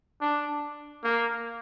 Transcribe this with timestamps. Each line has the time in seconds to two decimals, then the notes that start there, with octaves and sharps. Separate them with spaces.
0.21 D4
1.04 A#3